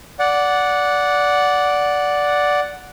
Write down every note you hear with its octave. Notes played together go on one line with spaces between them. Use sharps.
D5 F#5